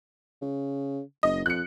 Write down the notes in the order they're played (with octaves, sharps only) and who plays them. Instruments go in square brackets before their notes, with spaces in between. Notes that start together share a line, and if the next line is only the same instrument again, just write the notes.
[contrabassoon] C#3
[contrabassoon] F#1 [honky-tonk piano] D#5
[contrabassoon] F2 [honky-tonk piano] F#6 C#7